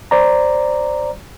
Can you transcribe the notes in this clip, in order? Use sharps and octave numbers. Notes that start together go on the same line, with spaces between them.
C5 D5 A#5